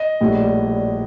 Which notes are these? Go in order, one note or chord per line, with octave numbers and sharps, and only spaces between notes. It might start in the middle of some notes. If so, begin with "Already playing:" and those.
Already playing: D#5
A#1 A2 G3 D4